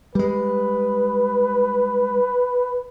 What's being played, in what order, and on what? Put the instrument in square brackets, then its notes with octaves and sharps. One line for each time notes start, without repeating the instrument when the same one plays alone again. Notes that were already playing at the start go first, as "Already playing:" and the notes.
[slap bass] G3 G#3 [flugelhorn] B4